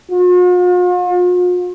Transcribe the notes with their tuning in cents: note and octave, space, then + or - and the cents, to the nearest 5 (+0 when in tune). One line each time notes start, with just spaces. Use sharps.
F4 +45